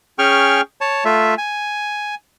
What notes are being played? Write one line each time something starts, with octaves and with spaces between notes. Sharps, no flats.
C#4 G#4 G5 C#6 F6
C#5 A5
A3 F4 E5
G#5